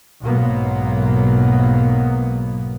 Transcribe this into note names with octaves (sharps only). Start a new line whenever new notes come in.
B1 G#2 F#3 A#3 B3